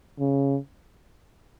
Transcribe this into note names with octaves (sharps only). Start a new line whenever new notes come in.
C#3